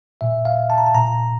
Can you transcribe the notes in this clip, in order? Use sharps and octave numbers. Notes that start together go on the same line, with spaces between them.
A#2 E5
F5
A5
A#5
A5
A#2 A#5